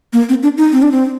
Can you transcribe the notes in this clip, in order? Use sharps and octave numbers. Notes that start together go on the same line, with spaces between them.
A#3
C4
D4
D#4
C4
D4
C4